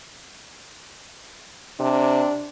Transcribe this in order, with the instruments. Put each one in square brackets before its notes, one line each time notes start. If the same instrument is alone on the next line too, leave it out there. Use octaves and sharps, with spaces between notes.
[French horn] C3 [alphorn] D4